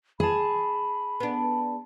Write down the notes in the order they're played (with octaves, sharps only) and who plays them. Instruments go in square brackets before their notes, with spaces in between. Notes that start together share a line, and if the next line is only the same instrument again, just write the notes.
[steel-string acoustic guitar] G#4 A5 [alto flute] B5
[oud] B3 D4